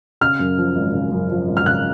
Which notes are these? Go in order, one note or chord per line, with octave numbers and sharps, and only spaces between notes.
C#3 F6
F#2
F3
G#1
C#3
F#2
F3
G#1
F6
C#3 F#6